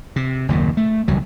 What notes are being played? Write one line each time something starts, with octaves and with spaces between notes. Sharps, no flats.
C3
F#1 D#2 A#2
A3
E1 C#2 F#3 G3